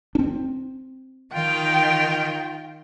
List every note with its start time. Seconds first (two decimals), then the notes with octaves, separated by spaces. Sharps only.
0.15 C4 D4
1.34 D#3 F4 G5